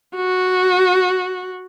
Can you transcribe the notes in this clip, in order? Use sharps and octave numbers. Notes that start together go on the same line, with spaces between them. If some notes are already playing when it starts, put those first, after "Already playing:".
F#4